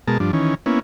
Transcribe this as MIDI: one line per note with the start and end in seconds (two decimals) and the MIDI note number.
0.08 0.18 47
0.08 0.18 56
0.08 0.18 70
0.08 0.18 81
0.20 0.31 43
0.20 0.31 53
0.20 0.31 62
0.33 0.55 51
0.33 0.55 52
0.33 0.55 61
0.66 0.79 58
0.66 0.79 59
0.66 0.79 61
0.66 0.79 64